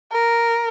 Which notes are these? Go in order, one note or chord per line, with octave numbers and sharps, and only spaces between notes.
A#4